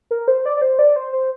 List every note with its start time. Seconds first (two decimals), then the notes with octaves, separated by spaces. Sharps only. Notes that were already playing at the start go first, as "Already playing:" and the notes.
0.11 A#4
0.28 C5
0.46 D5
0.57 D5
0.62 C5
0.79 D5
0.96 C5
1.12 C5